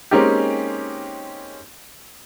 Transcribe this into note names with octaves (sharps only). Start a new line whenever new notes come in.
G#3 A#3 C4 C#4 D#4 G4